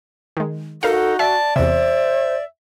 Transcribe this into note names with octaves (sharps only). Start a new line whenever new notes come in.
D#3 G#3
D#4 F#4 A4 A#4 F5
D5 E5 A5
E2 C3 C5 E5